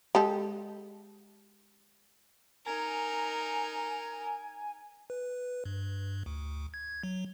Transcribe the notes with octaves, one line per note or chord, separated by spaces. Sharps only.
G#3 G4 A4
D#4 A#4 G#5
B4
G2
D2
G#6
F#3